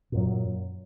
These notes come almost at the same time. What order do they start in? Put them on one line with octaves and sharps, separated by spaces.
A#2 F#2 F#3